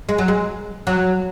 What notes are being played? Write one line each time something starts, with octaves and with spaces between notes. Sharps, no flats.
G#3
F#3
G#3
F#3